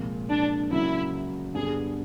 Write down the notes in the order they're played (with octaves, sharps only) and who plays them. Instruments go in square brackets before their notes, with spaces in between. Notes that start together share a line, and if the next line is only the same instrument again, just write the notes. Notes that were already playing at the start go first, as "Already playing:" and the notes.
Already playing: [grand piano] C2 A#2 F3 G#3
[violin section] D4
[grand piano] C#3 F#3 A#3 [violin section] E4
[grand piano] G2 D3 G3 B3 D4 [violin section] G#4